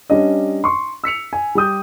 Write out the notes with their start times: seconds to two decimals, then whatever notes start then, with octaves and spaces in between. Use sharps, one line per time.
0.10 G3 C#4 D4 D#5
0.64 C6 C#6
1.04 E6 B6 C#7 F7
1.33 G#5
1.55 G3 G4 D#6 G6